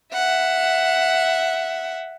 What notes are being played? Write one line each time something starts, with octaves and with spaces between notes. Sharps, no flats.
E5 F#5